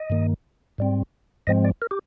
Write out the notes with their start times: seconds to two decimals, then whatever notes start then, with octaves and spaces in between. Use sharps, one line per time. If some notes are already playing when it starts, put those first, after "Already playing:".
Already playing: D#5
0.10 G2 D#3 A#3
0.78 G#2 G3 C4
1.47 G#2 F3 G#3 C4 D#5
1.65 D5
1.82 A#4
1.91 G4